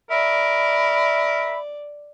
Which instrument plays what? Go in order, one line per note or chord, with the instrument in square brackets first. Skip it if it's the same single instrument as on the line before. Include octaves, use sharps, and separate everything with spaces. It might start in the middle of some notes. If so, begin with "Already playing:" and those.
[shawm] A#4 [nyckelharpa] D5 [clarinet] E5 [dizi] B5